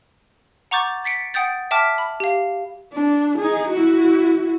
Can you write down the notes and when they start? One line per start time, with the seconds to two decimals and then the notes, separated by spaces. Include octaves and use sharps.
0.71 F#5 A#5 C#6 D6 G6 A6
1.04 A6 B6 C#7 D7
1.34 F#5 G5 D#6 G6 A6
1.71 E5 G5 A5 D6 F6 B6
1.98 B5
2.20 G4 F5
2.93 D4
3.39 D#4 G#4
3.71 E4 F#4